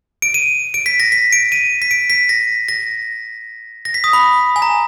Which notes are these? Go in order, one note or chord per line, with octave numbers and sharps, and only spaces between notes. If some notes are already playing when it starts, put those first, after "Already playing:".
D7
D#7
D7
B6
A#6
B6
D7
D#7
B6
D7
B6
A#6
A#6
A#6
B6
D#6
B5
G#5
A#5